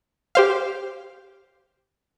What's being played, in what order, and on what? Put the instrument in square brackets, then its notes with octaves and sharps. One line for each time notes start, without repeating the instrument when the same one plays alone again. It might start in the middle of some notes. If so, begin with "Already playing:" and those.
[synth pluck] G4 C5 F5